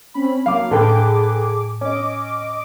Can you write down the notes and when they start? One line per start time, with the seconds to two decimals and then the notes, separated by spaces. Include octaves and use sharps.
0.14 C4 C#4 B5
0.46 F#3 A#3 F5 D6
0.71 A2 D3 G#4 B4 G5 D6
1.81 C#4 D#5 D6